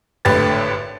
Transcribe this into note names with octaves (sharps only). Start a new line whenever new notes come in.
G#1 A2 D3 G4 B4 A6